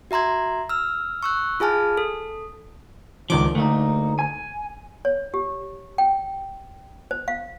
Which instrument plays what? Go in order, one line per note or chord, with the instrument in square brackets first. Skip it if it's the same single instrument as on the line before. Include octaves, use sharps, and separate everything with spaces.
[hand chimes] F#4 E5 A#5 C6 G#6
E6 F6
C#6 E6 F#6
F4 G#4 G#5 A5 F6
A4
[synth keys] C#2 D#3 D6 [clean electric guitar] F3 D4
[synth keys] D2 [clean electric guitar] A3 A#3 D#4
[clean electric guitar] G#5
[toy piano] C#5
G4
G5
C5
F5